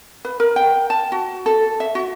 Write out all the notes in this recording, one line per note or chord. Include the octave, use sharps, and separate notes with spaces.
B4
A#4
G5
A5
F#4
A4
E5
F#4